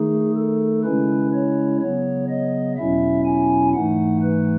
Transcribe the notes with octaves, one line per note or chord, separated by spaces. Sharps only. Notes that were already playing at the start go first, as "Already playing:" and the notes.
Already playing: D#3 A3 D#4 G#4
A4
C#3 G#3 C#4 E4 B4
C#5
C#3 F#3 B3 C#5
D#5
E2 B2 F#3 C#4 E4 E5
G#5
G#2 E3 A3 D#4 F#5
B4